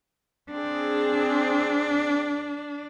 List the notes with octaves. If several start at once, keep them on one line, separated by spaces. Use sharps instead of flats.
C4 D4 G#4